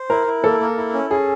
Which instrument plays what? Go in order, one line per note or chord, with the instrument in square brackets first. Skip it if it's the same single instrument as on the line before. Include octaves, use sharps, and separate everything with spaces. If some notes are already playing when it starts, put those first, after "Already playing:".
Already playing: [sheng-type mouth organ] C5
[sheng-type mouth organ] E4 [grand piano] A#4
[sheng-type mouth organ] E4
[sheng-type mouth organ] A#3 [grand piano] A4
[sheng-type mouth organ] A#3
E4
C#4
[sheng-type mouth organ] C#4 [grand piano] G#4